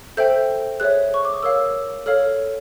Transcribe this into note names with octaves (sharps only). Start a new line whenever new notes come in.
A4 C5 E5 G5 G6
G#4 C#5 E5 F#6
C#6
D6
D#6
A#4 C#5 F5 E6
A4 C#5 F5 F6